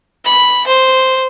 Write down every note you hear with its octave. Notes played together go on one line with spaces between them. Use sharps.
B5
C5